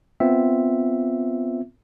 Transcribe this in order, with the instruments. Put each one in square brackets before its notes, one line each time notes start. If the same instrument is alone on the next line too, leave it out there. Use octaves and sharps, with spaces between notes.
[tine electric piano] B3 C4 F4 E5